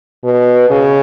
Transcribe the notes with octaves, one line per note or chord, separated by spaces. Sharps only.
B2
C#3